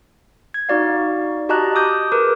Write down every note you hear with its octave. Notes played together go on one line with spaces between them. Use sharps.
G#6
D#4 F#4 D5 F5
F#4 G4 D#5 A5 A#5 F#6
D6 D#6 G6
G#4 A#4 B4 D6